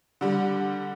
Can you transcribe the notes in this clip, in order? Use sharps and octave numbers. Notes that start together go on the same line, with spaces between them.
D3 G3